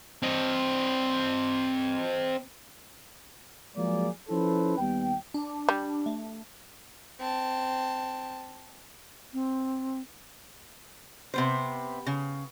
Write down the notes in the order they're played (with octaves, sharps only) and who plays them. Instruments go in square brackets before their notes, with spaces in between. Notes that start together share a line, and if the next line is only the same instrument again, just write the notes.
[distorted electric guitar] C4 D#5
[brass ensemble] F3 F#3 G#3 A#3 G#4 D5
F3 C#4 E4 A4 B4 C5
D#2 G3 B3 G5
[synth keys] D4
[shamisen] G3
[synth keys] A3
[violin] C4 A5
[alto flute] C4
[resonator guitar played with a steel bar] C3 B3 C5
C#3